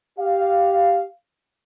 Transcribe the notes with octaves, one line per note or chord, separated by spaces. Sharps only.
G4 F5